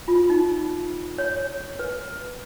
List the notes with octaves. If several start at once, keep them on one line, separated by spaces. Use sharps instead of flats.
F4
D#4
C#5
B4